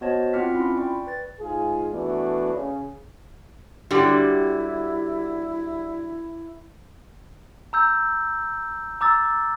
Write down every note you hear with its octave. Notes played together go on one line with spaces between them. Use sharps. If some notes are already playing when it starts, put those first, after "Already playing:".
B3 F#4 C5 C#5 D#5 A5
C4 F4 F#5 D6 F6 B6
C#4 E4 F4 B5 C6
D5 G5 C#6
B4 A6
G#2 F4 G#4
E3 A3 B3 D4 F#4
C#3
D3 F#3 G3 E4 G4
A#5 E6 G6
A#5 D6 E6 A6